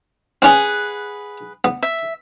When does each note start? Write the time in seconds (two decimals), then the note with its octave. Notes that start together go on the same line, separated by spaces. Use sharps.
0.42 C4 C#4 G#4 B4 F#5
1.64 B3
1.83 E5